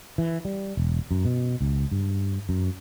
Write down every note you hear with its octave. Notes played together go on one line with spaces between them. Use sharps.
E3
G3
E1
F#2
B2
C#2
G2
F#2